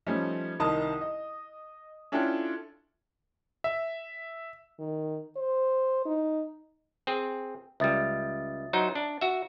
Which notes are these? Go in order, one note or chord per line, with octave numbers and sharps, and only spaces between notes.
F3 G3 A3 C#4 D#4
C2 D#3 D#5 A5 D#6
D#5
C#4 D4 E4 F4 A4 G5
E5
D#3
C5
D#4
C4 G#4
C#2 G3 E5 D#6 A6
F#3 D#4 C5
D4
F#4 E5